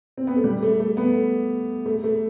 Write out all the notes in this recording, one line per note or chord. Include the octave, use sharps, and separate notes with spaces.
C4
B3
A3
G3
A3
A3
B3
A3
A3